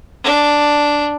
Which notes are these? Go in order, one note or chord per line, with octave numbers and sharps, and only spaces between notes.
D4